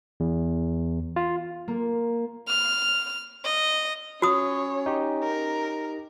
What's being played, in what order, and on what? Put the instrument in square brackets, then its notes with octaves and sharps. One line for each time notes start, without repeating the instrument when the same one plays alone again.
[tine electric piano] E2
F4
[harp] A#3
[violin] F6
D#5
[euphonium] C#4 [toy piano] F#4 D#6 [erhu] C#5
[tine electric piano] D#4 G4
[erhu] A#4